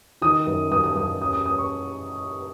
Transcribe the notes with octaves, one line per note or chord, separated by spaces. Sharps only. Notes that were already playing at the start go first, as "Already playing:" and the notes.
D#3 D#6
F#2
F#2 D#6
D#6
F#2 D#6
C#4 D#6
D#6
C#4 D#6
C#6